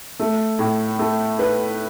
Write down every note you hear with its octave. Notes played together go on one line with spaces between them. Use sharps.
A3
A2
A3
B4